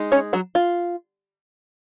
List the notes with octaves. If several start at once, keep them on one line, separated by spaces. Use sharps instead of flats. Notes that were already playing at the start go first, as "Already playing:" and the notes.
Already playing: G#3 D#4
C#4 C#5
F#3 F#4
F4